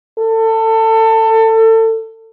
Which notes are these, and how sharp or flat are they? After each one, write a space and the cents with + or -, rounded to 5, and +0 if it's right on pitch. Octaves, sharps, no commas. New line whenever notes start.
A4 +25